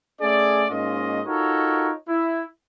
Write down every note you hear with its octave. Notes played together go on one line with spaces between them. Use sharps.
A3 C#4 G#4 D5
G#2 A#3 C#4 F4 D#5
D#4 F4 F#4 A4 A#4 C#5
E4